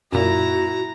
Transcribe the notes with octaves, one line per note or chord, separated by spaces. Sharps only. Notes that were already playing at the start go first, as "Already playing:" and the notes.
F#2 A#2 E4 F#4 A#5